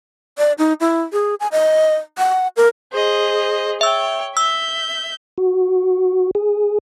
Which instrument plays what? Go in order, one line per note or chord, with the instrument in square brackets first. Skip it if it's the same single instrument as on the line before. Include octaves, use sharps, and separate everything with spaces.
[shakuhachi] D5
D#4
E4
G#4
G#5
D#5
F#5
A#4
[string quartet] G#4 C5 D#5
[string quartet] C#5 G5 [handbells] E5 E6
[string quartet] E5 G6 [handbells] E6
[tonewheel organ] F#4
G#4